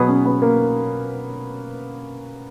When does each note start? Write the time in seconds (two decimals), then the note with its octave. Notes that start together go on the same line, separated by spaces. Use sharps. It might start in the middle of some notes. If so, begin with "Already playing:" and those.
Already playing: B2 F#3 B3 G#4
0.08 C#4
0.25 B3
0.42 A#3